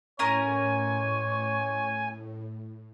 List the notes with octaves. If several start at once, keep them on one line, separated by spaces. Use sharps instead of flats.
A2 C#4 A#4 C#5 G#5